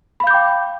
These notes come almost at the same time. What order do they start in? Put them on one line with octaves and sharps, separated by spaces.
B5 F5 G6 D6 G5